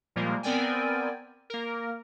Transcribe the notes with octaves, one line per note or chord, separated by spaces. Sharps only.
A#2 F3 G3 G#3 A#3
B3 C4 A#4 D5 G5 G#5
A#3 A#4